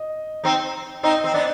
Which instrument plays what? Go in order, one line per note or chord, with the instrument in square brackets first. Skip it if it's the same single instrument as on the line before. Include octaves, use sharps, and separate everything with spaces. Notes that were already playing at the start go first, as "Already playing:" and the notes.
Already playing: [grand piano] D#5
[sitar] C4 D#4
[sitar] C4 D#4 [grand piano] D#5
[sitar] C4
B3 D4